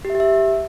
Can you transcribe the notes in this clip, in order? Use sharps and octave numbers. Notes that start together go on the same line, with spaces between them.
G4
E5
G4
E5